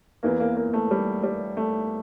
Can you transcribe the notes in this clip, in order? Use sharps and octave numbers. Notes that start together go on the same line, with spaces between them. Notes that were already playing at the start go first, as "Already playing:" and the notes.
E2 E3 A#3
A#3
A#3
A3
G3
G3
A3